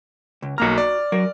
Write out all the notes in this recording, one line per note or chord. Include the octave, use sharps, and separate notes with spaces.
C#2
B1 A#3 F#4 A#5 F6
D5
F#3 A#4